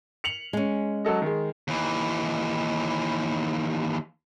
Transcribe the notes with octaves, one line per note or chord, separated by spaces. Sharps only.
C#7 F7 F#7
G#3 C#4
F#3 A4 D#5
D#3 G#3
D#2 E3